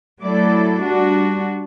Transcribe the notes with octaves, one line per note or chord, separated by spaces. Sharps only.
F#3 A3 E4 A4 D5
G3 D4 F#4